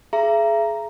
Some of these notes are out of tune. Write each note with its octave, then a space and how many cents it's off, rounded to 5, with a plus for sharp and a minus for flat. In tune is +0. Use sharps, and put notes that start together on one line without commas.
G#4 +30 E5 +40 A#5 +0